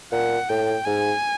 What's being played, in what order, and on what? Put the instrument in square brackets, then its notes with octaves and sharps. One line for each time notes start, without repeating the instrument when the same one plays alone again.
[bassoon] A#2 [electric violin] F#5
[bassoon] A2 [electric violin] G5
[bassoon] G#2 [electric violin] G#5